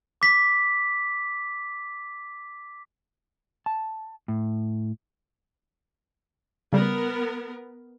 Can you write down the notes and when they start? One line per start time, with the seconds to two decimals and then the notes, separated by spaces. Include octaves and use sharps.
0.22 D6 B6
3.66 A5
4.28 A2
6.73 C#3 G3 B3 A#4